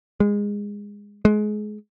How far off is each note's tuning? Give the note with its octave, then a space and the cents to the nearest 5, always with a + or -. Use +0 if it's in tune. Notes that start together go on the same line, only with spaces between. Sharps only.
G#3 -20
G#3 +25